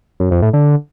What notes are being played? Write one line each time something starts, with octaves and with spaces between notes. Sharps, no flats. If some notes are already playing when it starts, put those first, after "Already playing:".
F#2
F2
A2
D3